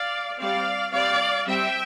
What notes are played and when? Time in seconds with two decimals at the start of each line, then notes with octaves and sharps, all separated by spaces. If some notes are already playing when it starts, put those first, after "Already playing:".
Already playing: D5 F5
0.38 G3 C4 D5 F5
0.92 G3 C4 D5 F5
1.47 G3 C4 E5 G5